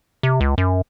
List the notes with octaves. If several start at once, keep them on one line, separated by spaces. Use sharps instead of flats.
C3
C#2
F#2